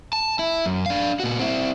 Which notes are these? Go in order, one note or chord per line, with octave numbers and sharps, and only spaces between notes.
A5
E4
F#2
D4 F5
A#2 F#4
C4 E4